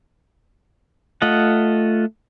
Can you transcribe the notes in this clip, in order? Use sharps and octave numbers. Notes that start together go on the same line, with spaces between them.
A3 F4 D#5 F#5